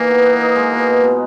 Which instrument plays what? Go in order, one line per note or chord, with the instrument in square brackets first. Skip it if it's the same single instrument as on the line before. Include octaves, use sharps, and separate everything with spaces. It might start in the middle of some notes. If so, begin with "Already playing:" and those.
Already playing: [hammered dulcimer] E3 D#4 [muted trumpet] A#3
[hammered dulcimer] B3
B3
D#4
G#3
B2
B2
B2